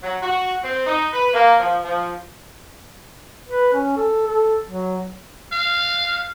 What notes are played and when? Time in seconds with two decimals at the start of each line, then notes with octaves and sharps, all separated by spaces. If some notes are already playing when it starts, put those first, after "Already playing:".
0.03 F#3
0.22 F#4
0.63 C4
0.87 D#4
1.13 B4
1.33 A#3
1.59 F3
1.83 F3
3.49 B4
3.74 C#4
3.97 A4
4.27 A4
4.68 F#3
5.53 F5